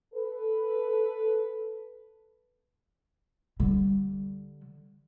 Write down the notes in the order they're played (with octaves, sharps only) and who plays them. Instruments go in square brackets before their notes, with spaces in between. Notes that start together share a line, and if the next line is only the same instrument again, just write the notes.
[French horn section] A4 B4
[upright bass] D3 G3